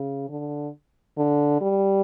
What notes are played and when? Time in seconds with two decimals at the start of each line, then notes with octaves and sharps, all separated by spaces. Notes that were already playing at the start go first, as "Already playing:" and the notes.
Already playing: C#3
0.29 D3
1.17 D3
1.61 G3